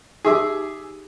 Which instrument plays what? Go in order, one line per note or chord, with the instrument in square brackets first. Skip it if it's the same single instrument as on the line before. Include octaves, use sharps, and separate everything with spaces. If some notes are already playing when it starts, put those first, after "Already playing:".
[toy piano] D#4 G4 D#6 [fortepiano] G#4 E5 D6